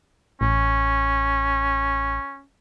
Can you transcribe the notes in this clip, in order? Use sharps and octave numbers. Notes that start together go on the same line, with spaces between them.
A1 C#4